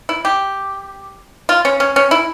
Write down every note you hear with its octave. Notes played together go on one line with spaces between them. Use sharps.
E4
G4
F4
C#4
C#4
C#4
E4